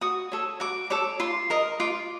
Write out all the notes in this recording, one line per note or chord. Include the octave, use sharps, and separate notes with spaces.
F#4 D#6
A4 C#5
F#4 D6
A4 C#5 D6
F4 C6
A#4 D#5
F4 D6